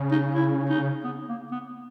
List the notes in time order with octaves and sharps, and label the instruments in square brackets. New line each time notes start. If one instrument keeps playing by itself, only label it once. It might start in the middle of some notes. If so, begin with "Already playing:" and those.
Already playing: [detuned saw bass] C#3
[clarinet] D#4
E4
D#4
B3
A#3
B3